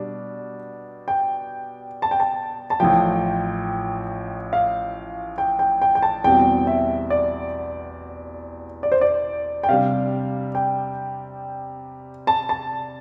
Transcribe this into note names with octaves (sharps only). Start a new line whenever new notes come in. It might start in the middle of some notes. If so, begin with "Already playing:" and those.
Already playing: B2 G3 D4
G5
A5
G5
A5
A5
A1 A2 F3 G5
F5
G5
G5
G5
G5
A5
E2 B2 G3 C4 G5
E5
D5
D5
C5
D5
G5
C3 G3 D4 F5
G5
A5
A5